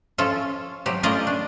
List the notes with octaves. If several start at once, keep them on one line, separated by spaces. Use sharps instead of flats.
F3 C#4 F4 A4
F3 F#3 G4
A3 C#4 F4 A#4 D5 D#5
D4